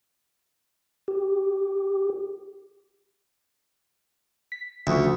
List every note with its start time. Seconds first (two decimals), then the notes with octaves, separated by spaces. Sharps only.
1.08 G4
4.52 B6
4.87 D2 C#3 F3 C#6